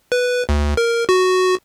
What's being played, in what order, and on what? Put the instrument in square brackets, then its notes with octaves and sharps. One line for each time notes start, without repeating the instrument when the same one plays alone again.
[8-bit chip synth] B4
D2
A#4
F#4